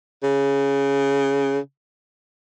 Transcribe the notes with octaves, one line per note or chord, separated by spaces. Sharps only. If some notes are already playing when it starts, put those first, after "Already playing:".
C#3